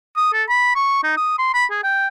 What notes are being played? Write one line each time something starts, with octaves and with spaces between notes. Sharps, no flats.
D#6
A4
B5
C#6
D#4
D#6
C6
B5
G#4
G5